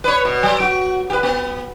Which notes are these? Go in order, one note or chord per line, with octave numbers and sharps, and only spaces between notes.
B4 C#5
B2
F#3
F#4
G4 B4
B3